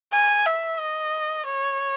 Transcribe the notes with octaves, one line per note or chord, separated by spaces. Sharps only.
G#5
E5
D#5
C#5